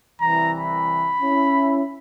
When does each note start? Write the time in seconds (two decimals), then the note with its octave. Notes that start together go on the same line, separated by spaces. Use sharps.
0.21 C2 E3 A#5
0.59 B5
1.22 C#4 E4